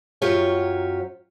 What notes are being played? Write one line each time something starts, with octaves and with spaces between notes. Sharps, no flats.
F#2 F#3 F4 G4 C#5